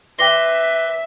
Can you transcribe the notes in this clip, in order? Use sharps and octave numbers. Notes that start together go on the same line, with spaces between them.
B4 E5 G5 C6 D6 A#6